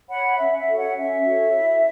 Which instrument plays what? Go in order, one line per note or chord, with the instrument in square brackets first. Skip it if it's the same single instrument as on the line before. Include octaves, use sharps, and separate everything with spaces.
[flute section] C#5 F#5 B5
C#4 E5
E5
F#4 A4
C#5 F#5
C#4 E5
F#4 A4 C#5
E4